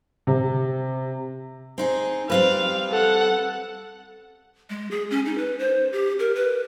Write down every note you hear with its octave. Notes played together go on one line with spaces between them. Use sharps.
C3
C4 D#4 G#4
G3 C4 B4 F5
A4 F#5
G#3
G#4
C#4
D#4
B4
C5
G4
A#4
B4